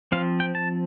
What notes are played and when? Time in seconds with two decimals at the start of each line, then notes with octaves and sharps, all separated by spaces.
0.12 F3 C4 F5
0.40 G5
0.55 A5